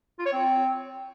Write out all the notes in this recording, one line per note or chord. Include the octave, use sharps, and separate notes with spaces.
F4
C#5
C4